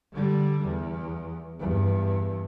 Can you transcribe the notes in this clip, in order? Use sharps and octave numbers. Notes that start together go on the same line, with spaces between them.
D3 G3
E2
E2 G2